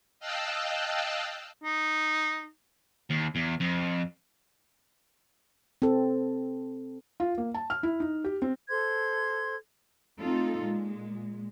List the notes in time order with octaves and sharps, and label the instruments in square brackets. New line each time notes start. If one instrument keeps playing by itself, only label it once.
[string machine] D#5 F5 G5 A5 E6 F#6
[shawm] D#4
[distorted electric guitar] D#2
E2
F2
[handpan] C4 A4
[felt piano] F4
A#3
A5
F6
E4
D#4
G4
C4
[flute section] A4 C5 C6 G#6
[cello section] A3 C4 D#4 F4 A4
A#2 G#3